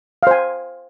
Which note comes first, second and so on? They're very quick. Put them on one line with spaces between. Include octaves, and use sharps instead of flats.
F5 C5 G#5